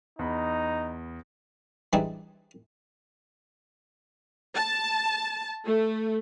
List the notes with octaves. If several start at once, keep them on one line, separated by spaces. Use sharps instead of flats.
E2 D#4 B5
E3 G3 C4 D4 D#4 G#4
A5
A3